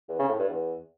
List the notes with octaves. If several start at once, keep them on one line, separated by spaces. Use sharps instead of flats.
E2
C#3
A2
G2
E2